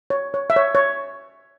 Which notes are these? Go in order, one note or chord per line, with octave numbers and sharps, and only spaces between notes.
C#5
C#5
E5
C#5
C#5